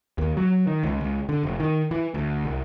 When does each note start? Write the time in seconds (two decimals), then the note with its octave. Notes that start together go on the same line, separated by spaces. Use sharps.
0.18 D#2
0.37 F#3
0.67 D#3
0.83 C#2
1.01 C#2
1.29 D3
1.43 F1
1.60 D#3
1.91 E3
2.14 D2
2.45 C2